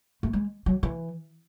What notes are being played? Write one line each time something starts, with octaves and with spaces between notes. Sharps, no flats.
A3
G#3
F#3
E3